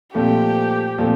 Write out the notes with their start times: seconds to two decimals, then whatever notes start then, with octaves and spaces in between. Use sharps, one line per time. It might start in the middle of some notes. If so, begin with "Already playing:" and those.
0.14 A#2 F3 A3 C4 G4
0.98 A#2 F3 A3 C4